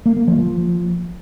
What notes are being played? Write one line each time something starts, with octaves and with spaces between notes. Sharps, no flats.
A#3
A#3
F3
F3